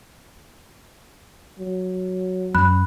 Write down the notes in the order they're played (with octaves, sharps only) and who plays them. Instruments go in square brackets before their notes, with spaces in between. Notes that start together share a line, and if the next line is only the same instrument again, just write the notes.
[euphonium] F#3
[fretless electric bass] F#2 [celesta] B5 F#6